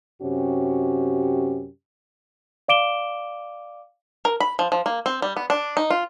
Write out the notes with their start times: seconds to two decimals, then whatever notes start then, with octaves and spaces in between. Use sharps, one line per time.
0.22 F#2 C3 C#4 F#4 G4
2.68 D5 F5 D6 D7 E7 G7
4.25 A#4
4.40 B5
4.59 F3
4.72 F3
4.86 A#3
5.06 C4
5.22 G3
5.37 B3
5.50 D4
5.77 D#4
5.91 F4